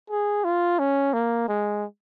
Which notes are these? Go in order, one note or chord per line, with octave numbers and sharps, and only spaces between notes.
G#4
F4
C#4
A#3
G#3